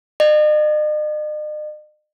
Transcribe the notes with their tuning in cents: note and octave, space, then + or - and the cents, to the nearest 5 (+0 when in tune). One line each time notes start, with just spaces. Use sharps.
D#5 -45